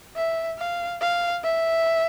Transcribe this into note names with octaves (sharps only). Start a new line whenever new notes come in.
E5
F5
F5
E5